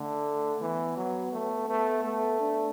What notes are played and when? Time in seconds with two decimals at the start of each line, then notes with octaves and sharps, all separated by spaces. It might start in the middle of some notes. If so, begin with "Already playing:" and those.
Already playing: D3 A3
0.61 E3 B3
0.97 F#3
1.32 A3
1.69 A3 B3
2.04 A3
2.40 D4